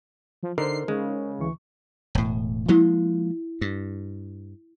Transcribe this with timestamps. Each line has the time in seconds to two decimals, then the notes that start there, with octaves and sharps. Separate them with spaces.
0.43 F3
0.58 D3 D#4 A#4 C5 C7
0.88 C#3 G#3
1.39 D2 E3 C#6
2.15 E1 A2
2.69 F3 G#3 A#3 E4
3.61 G2